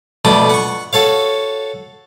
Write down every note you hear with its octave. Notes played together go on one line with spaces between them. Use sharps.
F2 B2 A3 D4 D#6
F#5 C#6
F#4 A4 C#5 F5